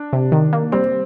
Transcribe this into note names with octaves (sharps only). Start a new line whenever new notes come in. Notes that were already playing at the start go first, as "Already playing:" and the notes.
Already playing: D4
C3
D#3
A#3
G3 C4